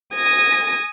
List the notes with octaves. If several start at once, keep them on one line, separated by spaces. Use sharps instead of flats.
G#5 D#6 A#6